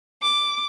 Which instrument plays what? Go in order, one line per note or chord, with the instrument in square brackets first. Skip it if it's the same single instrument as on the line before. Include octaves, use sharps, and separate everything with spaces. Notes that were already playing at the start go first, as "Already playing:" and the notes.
[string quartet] D6